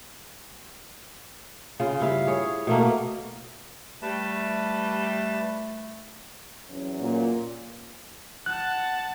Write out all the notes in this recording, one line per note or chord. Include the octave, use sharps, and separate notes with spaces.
C#3 F4
G2 E4 F5
G#4 C#5
B2 A3 A#3
G3 A3 B4 A5
E2 F#3 C#4
A#2
F#5 A5 F#6